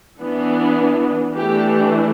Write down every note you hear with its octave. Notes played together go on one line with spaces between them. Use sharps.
E3 B3 D4
E3 A3 D4 G4